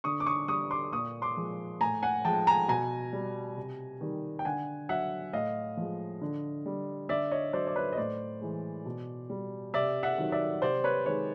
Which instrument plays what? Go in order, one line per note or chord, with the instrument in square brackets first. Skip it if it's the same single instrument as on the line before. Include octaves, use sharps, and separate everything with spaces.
[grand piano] D3 C#6 D#6
D6
C#6 D#6
G3 C#6 D#6
C6 D6
A#2 C#6 D#6
C6 D6
F3 G#3
A2 G#5 A#5
F#5 G#5
F3 G#3 G5 A5
G#5 A#5
B2 G#5 A#5
G3
C3
D#3 G3
G5
D3 F#5 G#5
F#3 E5 F#5
A2 D#5 F5
F3 G#3
D3
G3
D3 D5 E5
C#5 D#5
F#3 C5 D5
D5
B4 C#5
D#5
A2 C5 D5
E3 G#3
B2
G3
C3 D5 E5
E5 F#5
D#3 F#3
D5 E5
C3 C5 D5
B4 C#5
D#3 G#3 B4 C#5